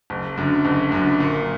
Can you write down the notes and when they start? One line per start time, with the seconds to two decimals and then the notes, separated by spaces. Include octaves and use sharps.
0.10 F#1
0.37 F#2 D3
0.65 F#1
0.92 F#2 D3
1.20 A#2